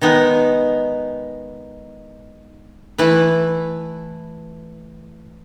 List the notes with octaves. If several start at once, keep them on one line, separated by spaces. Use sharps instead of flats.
D#3 G#3 B3 D#4
E3 A3 E4 B4